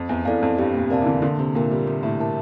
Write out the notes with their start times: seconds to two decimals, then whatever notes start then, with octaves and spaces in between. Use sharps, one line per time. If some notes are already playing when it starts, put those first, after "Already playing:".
Already playing: F2
0.09 E2
0.25 E2 E4 A4 D5 F5
0.43 F2
0.58 G2 G4
0.74 A#2
0.90 C3 A#4 D5 F5 A5
1.02 E3
1.06 D3
1.22 D3 A#3
1.39 C3
1.55 A#2 F4 A#4 E5
1.71 G3
1.87 A#3
2.03 A2
2.19 E4 A#4 E5 A5